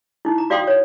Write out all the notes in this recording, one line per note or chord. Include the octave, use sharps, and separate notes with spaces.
D#4 E4
A#5
F#4 D5 F5 G5 C6 D#6
C#5